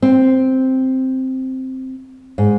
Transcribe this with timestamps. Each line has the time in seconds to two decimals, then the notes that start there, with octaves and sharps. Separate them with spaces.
0.02 C4
2.38 G#2